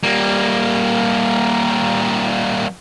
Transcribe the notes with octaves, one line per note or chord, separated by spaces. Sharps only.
G3 A#3